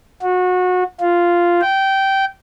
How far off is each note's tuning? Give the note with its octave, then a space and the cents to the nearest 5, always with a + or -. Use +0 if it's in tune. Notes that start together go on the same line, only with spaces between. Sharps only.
F#4 -25
F4 -5
G5 -15